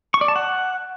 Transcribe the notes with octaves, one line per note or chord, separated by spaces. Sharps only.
C#6
D5
A5
F#5